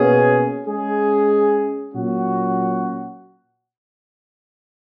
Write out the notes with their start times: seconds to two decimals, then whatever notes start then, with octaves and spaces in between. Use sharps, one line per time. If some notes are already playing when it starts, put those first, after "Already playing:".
Already playing: B2 A#3 C#4 G#4
0.66 G#3 C#4 G#4
1.92 A#2 F#3 C#4 F#4